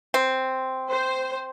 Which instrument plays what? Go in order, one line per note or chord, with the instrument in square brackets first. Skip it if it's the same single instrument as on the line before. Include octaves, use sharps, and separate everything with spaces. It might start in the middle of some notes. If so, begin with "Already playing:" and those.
[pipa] C4
[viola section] C5